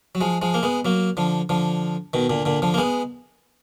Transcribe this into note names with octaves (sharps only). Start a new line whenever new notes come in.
F#3
F3 G#3
F3 G#3
A#3
G#3 B3
F#3 A#3
D3 F3
D3 F3
B2 D#3
A#2 D3
A#2 D3
D3 F3
A#3
G#3 B3